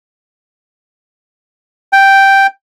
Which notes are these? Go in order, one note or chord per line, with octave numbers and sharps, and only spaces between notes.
G5